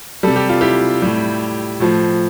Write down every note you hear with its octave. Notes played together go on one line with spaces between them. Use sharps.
C3 G3 A4
G4
F4
E4 G4
A2 G3
A2 F3